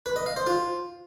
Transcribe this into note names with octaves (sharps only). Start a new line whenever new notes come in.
B4
D#5
F5
C5
F4